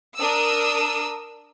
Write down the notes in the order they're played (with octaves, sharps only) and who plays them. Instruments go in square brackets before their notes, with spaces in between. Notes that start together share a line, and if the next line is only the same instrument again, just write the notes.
[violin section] D4 A#4 D#6 E6